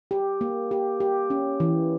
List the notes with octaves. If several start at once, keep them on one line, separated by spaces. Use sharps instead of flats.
G4
A#3
G4
G4
C#4
E3